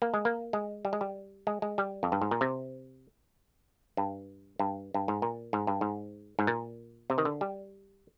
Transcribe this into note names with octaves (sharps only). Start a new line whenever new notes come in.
A#3
G#3
A#3
G#3
G3
G#3
G3
G#3
G#3
G3
F2
G2
G#2
A#2
C3
G2
G2
G2
G#2
A#2
G#2
G2
G#2
G#2
A#2
C3
D#3
D3
G3